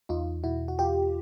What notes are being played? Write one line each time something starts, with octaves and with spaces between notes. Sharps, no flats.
E2 D#4 F4
B2 E4 F#4
F#4
E2 F4 G4